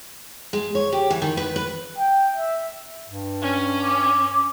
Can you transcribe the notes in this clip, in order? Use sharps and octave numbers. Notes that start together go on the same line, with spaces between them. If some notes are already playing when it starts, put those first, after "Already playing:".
G#3
C#5
G4
E3
D#3
B4
B4
G5
E5
G2
C#4
D6